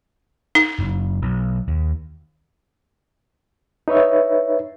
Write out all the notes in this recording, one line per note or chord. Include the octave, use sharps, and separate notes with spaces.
D#4
F#1
B1
D#2
D#4 B4 C#5 E5